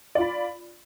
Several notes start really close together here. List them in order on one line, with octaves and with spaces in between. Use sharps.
D5 F4 B5